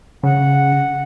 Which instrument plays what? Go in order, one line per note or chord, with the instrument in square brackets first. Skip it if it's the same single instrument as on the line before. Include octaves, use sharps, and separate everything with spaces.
[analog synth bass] C#3 [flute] F#5